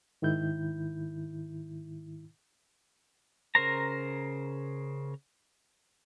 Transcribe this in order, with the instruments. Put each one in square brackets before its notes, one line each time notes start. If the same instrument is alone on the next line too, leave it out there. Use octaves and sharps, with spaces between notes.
[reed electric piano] G#2 D#3 E4 G6
[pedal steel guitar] C#3 A#4 C5 A#5